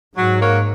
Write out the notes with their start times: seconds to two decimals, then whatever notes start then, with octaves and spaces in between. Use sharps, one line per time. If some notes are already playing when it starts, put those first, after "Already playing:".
0.17 G#2 F#3
0.40 A#3 F#4 C#5